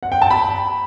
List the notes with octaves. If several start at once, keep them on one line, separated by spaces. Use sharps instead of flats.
F#5
G5
A5
B5